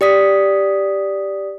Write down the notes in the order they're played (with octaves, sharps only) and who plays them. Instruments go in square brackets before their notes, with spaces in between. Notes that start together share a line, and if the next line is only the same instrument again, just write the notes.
[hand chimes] G4 D5 D#6 B6